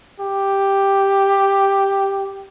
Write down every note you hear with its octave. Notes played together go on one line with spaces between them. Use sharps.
G4